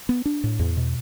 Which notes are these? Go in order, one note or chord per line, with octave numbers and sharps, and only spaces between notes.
B3
D4
A2
E2
B2